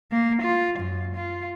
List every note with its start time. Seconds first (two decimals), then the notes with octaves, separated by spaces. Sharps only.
0.12 A#3
0.42 F4
0.79 F#2
1.16 F4